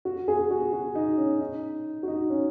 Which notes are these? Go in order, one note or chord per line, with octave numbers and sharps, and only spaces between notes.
F#4
G#4
F#4
F#4
D#4
C#4
D#4
F#4
D#4
C#4